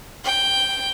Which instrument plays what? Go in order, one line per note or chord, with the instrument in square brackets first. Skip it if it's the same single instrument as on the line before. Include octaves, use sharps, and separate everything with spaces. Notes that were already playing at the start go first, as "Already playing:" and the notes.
[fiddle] G5